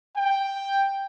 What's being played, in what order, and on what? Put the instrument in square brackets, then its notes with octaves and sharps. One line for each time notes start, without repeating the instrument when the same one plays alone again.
[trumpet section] G5